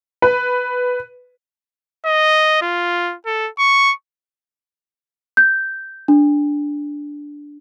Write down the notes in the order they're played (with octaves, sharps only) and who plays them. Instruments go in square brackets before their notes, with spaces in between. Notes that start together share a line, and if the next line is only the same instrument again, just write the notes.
[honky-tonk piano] B4
[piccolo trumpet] D#5
F4
A4
C#6
[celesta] G6
D4